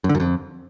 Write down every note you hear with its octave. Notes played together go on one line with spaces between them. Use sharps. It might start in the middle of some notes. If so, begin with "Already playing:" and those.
F#2
D3
F#2
F2